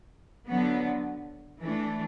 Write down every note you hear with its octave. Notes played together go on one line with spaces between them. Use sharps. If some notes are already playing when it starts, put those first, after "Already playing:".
D3 F#3 B3
E3 A3 D4